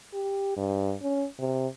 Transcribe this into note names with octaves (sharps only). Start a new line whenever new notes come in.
G4
G2
C#4
C3